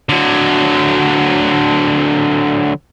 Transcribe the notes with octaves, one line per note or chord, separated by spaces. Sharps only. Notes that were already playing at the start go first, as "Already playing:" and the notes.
D3 F#3